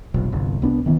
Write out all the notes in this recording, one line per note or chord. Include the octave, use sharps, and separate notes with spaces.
F1 B1
G1 C2
C2 B3 D4
E1 D#3 E3 B3